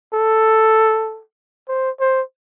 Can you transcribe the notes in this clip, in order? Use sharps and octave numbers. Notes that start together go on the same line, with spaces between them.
A4
C5
C5